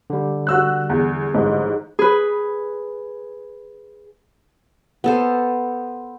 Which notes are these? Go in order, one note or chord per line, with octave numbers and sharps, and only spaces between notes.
D3 G3
F#4 E6 F#6
E2
A1 G#2
G#4 B4
B3 A4 C5